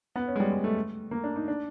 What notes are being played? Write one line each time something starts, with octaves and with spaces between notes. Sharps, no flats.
B3
C#4
G#3
G3
G#3
A3
A#3
D4
D#4
D4